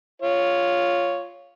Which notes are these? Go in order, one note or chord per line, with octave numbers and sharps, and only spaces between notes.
F4 C#5